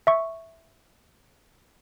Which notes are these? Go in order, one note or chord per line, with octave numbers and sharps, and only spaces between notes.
E5 C#6